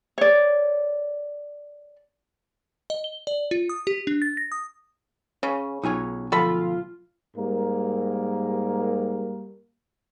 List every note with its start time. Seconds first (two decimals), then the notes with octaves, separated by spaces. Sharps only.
0.18 C#5 D5
2.90 D#5
3.04 G7
3.27 D5
3.51 F4
3.69 D#6
3.87 G4
4.07 D4
4.22 A6
4.37 A#6
4.52 D#6
5.43 C#3 C#4
5.84 B1 D#4 F4 C#5 G#5
6.32 D2 F3 F4 A4 B5
7.37 G#2 G3 A#3 A#4